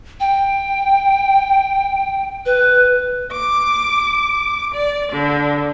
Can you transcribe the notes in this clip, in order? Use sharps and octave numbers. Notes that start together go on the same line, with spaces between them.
G5
B4
D6
D5
D3